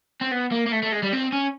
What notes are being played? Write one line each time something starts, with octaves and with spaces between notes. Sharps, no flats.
C4
B3
A#3
A#3
A3
A3
G#3
G3
C4
C#4